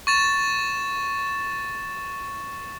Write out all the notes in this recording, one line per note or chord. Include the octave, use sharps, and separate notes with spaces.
C#6 A6 E7